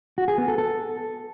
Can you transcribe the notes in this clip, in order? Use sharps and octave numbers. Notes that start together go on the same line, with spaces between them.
F#4
G#4
B3
A4
A4